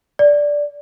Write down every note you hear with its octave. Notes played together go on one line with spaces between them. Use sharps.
D5